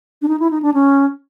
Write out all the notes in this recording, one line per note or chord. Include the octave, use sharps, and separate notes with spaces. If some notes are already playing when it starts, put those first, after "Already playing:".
D4
D#4
E4
D#4
D4
C#4